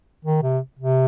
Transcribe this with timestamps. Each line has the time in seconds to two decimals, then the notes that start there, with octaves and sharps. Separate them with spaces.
0.25 D#3
0.43 C3
0.79 C3